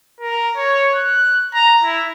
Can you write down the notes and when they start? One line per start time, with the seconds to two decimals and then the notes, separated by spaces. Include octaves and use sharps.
0.20 A#4
0.56 C#5
0.95 F#6
1.54 A#5
1.83 E4